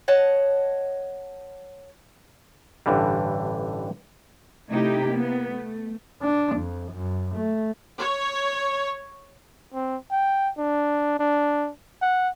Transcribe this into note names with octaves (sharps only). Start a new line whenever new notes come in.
C#5 D#5 F#5 A5
A1 G2 D3 E3 G3
C3 A3 D#4 E4 G4
A#3 B3
A3
D4
F2
F#2
A3
C#5
C4
G5
D4
D4
F#5